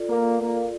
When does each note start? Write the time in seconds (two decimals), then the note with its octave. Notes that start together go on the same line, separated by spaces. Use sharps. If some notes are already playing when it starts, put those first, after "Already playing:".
Already playing: F4 A4 D5
0.10 A#3
0.41 A#3